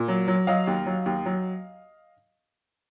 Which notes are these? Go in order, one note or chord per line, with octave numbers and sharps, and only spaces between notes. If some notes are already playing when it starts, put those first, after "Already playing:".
Already playing: A#2
F#3
F#3
F#3 D#5 F5
D#2
F#3
D#2
F#3